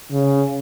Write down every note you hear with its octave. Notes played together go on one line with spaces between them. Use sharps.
C#3